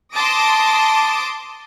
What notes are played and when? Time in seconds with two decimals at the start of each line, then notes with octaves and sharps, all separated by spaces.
0.13 A5 C6 D6 D#6 A#6 D7